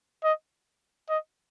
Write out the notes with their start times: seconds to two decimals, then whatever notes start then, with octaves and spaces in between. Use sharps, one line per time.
0.24 D#5
1.09 D#5